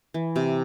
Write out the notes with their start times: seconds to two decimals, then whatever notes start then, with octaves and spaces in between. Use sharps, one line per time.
0.14 E3
0.36 C3